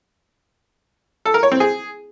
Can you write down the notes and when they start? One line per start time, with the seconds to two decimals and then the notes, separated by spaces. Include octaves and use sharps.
1.25 A4
1.34 A#4
1.43 C#5
1.52 C4
1.60 G#4